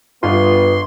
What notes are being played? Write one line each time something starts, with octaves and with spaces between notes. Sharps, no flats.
G1 G3 B3 F4 C6